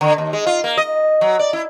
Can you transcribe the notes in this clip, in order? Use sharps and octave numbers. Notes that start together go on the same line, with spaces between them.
D3
D#2
G#3
F4
A#3
D#5
F#3
D5
E4